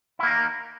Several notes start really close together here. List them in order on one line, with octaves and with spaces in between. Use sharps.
E4 A#3 D#4 A#4